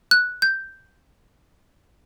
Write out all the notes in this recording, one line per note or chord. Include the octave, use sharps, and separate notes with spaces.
F#6
G6